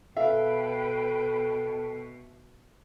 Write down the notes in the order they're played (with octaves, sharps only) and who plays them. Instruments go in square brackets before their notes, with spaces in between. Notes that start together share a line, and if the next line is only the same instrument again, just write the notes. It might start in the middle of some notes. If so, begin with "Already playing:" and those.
[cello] B2 [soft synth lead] A4 [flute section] B4 G5 [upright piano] E5 F5